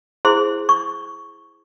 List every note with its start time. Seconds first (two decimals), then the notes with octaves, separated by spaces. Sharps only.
0.25 E4 G#4 C5 C6
0.69 C#6